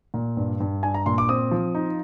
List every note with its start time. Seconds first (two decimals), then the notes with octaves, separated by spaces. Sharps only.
0.14 A#2
0.37 G2
0.60 G2
0.83 D4 G#5
0.94 A#5
1.06 A#2 C6
1.18 D6
1.29 C4 D#6
1.51 F3
1.75 D#4